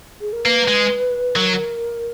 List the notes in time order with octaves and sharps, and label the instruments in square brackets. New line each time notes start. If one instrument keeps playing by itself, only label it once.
[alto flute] G#4
A#4
[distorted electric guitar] A#3 [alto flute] B4
[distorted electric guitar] G#3
[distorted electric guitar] F#3 [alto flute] A#4